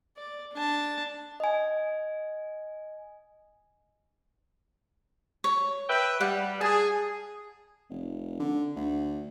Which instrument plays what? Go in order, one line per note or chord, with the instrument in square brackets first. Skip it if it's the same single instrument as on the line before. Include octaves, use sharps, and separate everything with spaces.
[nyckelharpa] D5
D4 A5
[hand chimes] D#5 G#5
[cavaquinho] C#5
[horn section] B4 E5 G5
[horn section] G3 [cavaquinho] F#5
[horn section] G#4 [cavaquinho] A5
[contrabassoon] F1
D3
D2